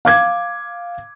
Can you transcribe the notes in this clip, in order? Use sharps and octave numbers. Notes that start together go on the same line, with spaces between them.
F5 D6 G#6